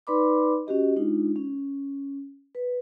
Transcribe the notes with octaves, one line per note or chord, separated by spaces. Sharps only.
D#4 B4 D5 B5 C6 D6
C#4 F#4 G4 D#5
G#3 D4 D#4 F4
C#4
B4